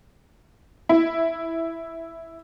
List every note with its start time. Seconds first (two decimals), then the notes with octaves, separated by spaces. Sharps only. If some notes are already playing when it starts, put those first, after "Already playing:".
0.89 E4